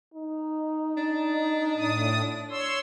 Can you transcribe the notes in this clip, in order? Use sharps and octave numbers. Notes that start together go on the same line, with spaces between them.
D#4
D4
A2 D#6
C#5 C6 E6